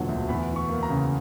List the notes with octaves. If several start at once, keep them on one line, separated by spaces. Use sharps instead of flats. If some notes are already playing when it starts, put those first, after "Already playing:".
Already playing: E1 A#2 D3 F#3
D2
E2 B5
E3
C#6
A#3
A#5
C#3